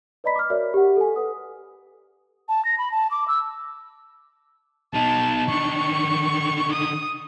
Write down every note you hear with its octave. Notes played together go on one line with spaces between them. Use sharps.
B4 D5 D#5 A#5 B5 B6
D6 F6
F#4 A#4 C#5 D5 E5
G4 F#5
A4 G#5
A4 B4 F#5 D#6
A5
A#6
B5
A5
D6
E6
B2 D#4 A5
D3 D#3 C#6
D#6